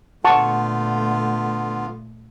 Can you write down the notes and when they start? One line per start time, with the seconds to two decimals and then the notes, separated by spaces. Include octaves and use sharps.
0.25 A#2 D3 A3 B3 F4 F#5 A5 C#6